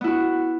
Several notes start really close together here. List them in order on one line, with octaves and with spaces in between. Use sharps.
B3 E4 F#4